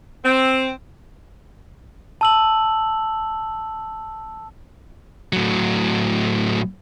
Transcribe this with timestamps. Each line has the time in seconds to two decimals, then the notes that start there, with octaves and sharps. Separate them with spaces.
0.25 C4
2.21 A5 E6 F#7
5.33 A2 F#3